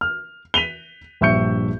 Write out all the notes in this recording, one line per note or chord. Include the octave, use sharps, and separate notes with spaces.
F6
B6 D#7 F7 G7
A#1 G2 E5 C#6 G6 C#7